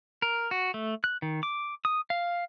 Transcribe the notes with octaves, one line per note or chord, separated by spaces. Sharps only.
A#4
F#4
A3
F#6
D#3
D6
D#6
F5